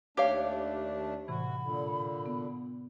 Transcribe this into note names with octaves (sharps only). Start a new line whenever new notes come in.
D#2 A3 D4 G4 C#5 F5
A2 C3 E3 F#4 B5
A#2 D3
B3